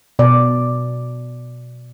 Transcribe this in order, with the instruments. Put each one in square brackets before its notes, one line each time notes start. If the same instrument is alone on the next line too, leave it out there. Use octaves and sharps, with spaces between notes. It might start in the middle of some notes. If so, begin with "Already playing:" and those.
[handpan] B2 D5